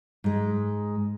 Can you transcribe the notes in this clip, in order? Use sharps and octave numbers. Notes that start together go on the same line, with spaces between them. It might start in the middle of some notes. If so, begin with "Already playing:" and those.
G#2 G#3